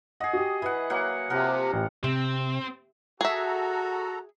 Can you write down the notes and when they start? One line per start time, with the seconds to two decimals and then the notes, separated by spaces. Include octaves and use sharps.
0.20 G#4 D#5 F#5
0.33 F#4 G4
0.62 E3 B4 F#5
0.90 F#3 A#3 F#5
1.30 C3 F3 A#4 F#5
1.73 A1 G4
2.04 C3 C4
3.21 F#4 G#4 A4 E5 A#5